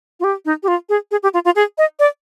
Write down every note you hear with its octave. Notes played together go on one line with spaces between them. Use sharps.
F4
G4
D#4
G4
F4
G#4
G#4
G4
F4
F4
G#4
D#5
D5